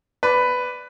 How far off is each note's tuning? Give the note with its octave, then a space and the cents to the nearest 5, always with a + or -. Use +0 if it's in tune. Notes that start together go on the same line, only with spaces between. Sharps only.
B4 +10 D5 +0